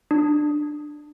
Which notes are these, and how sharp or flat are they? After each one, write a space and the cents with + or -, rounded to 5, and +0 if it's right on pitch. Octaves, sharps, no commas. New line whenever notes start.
D4 +20